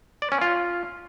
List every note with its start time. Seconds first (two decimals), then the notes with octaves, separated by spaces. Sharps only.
0.22 D5
0.32 C#4
0.41 F4